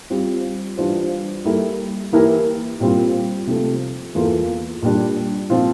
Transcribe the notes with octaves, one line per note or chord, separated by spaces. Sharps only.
G3 C4 F4
E3 G3 D4 F4 C5
G3 A#3 E4 A4
E3 A#3 E4 G4 A#4
A#2 G3 C4 F4
C3 F3 A3
E2 E3 A#3 F4 A4
A#2 G3 D4
A#2 F3 C4 F4